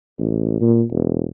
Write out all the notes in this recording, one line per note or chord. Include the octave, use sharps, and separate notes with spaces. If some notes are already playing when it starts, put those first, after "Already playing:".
A1
A#2
E1